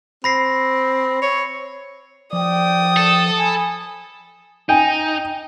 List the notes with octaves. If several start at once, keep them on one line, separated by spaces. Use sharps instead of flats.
C4 B5 A#6 C7
C#5
F3 D5 G5 D#6
A4
G#5 B5
D#4 G5 G#5